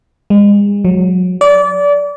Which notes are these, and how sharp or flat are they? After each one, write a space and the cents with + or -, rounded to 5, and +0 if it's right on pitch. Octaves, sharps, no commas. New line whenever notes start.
G#3 -35
F#3 -30
D5 -25